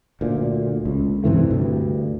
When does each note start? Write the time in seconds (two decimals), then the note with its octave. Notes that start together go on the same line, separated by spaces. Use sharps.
0.21 D2 A#2
0.85 C#2
1.24 G2 C3 E3 A3
1.51 D2 G2